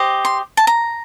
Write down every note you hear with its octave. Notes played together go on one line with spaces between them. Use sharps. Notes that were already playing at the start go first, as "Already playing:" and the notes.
Already playing: G4 C5 D#5
C6
A5
A#5